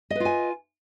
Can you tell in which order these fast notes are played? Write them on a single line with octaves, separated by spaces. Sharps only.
D#5 B4 F4 G#5